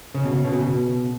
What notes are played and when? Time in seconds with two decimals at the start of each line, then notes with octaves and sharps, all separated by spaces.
0.14 C#3
0.23 B2
0.33 C#3
0.45 B2
0.52 C#3
0.61 B2